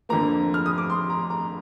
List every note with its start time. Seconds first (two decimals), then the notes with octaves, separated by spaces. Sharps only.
0.09 F2 D3 F3 A#3 A#5
0.54 F6
0.66 D#6
0.78 D6
0.90 C6
1.10 A#5
1.30 A#5